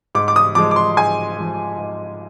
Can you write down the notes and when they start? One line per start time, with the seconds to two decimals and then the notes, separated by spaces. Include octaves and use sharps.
0.15 G#2 D6
0.28 D6
0.36 D#6
0.55 F3 G#3 D6
0.71 D6
0.76 C6
0.97 G#2 G#5
1.38 F3 G#3
1.78 G#2